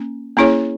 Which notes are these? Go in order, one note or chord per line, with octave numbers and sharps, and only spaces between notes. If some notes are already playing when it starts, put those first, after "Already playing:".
Already playing: A#3 C#4
A#3 C#4 E4 G#4 C#5